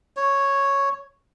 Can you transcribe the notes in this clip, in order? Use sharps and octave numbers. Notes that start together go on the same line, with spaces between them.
C#5